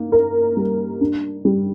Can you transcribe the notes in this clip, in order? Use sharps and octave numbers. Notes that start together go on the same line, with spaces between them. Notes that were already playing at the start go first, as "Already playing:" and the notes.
Already playing: A#3 D#4
A#4
G3
D4
G3